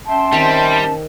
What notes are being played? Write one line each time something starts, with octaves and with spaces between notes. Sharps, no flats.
C#4 E5 G5 A5 C6
D#3 G3 C4